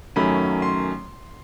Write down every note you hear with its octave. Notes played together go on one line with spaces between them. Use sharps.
F#2 D#3 F#3 A3 C#4 B5
C6